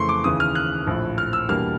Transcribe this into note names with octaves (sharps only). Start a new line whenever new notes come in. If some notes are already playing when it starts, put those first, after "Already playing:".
Already playing: F2 C#3 E3 A3 C6 C#6
D6
D#2 C#3 E3 D#6
F6
F#6
A#1 A2 F3
F6
E6
E2 B2 G3 A#3 D4 F6